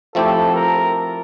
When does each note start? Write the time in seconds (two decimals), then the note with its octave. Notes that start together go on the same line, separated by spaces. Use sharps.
0.15 F3 A3 C4 E4 G4 A4
0.55 A#4